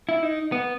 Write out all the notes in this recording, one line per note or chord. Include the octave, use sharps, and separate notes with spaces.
E4
D#4
B3